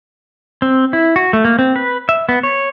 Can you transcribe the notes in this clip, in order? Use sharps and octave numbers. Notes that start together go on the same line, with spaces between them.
C4
E4
F#4
A3
A#3
C4
B4
E5
B3
C#5